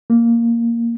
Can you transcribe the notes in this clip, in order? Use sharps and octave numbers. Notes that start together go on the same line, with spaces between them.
A#3